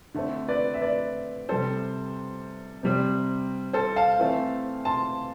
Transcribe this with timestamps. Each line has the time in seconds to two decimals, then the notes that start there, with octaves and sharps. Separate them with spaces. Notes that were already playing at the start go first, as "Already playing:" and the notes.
0.14 D3 A3 C4
0.48 B4 D5
0.74 E5
0.82 B4 D5
1.49 C3 G3 C4 A4 C5
2.83 C3 G3 C4
3.73 A4 C5
3.96 F5 A5
4.19 E3 A3 C4
4.85 A5 C6